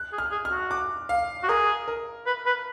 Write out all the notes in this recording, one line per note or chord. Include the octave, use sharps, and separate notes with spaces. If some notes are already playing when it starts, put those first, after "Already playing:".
Already playing: F#6
G#4
F6
G#4
F6
F#4
D6
F5
F#4
G#4 A#4
A#4
B4
B4